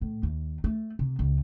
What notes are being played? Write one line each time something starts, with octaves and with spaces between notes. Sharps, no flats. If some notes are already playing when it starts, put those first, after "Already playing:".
A2
D#2
A3
C3
C#2